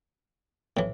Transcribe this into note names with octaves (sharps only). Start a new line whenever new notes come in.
A2 E3